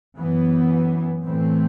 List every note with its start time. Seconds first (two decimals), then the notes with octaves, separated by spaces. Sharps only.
0.17 F#2 E3 B3
1.25 A2 E3 A3 C4